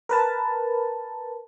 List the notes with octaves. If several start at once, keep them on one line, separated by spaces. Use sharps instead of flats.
A#4 B4 A5